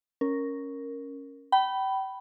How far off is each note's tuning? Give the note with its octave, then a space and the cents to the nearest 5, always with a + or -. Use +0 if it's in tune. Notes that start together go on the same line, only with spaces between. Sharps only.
C#4 +0 A#4 +0
G5 -30 B5 +0